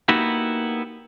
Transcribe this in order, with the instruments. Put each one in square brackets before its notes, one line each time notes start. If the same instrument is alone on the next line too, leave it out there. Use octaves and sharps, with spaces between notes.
[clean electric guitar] A#3 B3 D#4 E4 F#4 G4